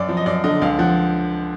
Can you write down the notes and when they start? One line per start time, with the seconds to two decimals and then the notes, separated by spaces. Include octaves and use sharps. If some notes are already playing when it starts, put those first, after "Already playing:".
Already playing: F#2 D5
0.09 F3
0.17 D#5
0.26 F#2 D5
0.44 D3 D#5
0.62 C#2 F5
0.79 F3 F#5